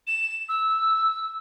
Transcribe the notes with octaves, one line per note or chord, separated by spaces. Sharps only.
E7
E6